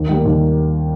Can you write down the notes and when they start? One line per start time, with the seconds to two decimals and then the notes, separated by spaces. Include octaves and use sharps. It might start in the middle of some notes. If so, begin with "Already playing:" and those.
Already playing: D#2
0.09 D#3 G3 A#3
0.26 D#2